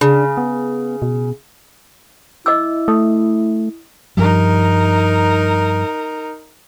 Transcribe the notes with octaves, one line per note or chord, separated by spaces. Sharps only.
C#3 D4
B3
B2
E4 D#5 D6 E6
A3 D#6
G2 F3 G3 D#4 A#4